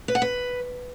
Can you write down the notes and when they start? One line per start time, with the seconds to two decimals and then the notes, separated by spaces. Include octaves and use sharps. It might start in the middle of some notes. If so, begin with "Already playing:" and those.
0.08 B4
0.15 F#5
0.22 B4